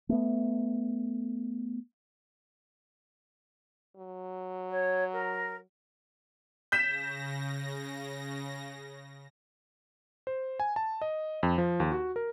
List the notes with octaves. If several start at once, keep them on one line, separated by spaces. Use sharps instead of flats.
A3 B3
F#3
C#5
A#4
C#3 G6 A#6 B6 E7
C5
G#5
A5
D#5
F2
F3
D#2
F#4
A#4